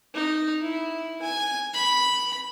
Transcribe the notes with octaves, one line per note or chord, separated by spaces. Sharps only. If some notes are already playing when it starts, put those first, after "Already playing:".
D#4
E4
G#5
B5